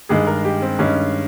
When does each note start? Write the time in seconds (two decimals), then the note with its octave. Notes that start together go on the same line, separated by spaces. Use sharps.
0.09 G2 D#3 G#3 G#4
0.27 A#4
0.45 G4
0.62 C4
0.79 G2 D#3 G#3 C#4